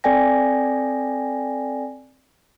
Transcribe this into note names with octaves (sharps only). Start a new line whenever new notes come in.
C4 A4 D5 G5 G#5 A#6